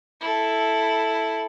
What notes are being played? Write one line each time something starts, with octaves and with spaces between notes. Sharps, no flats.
E4 A4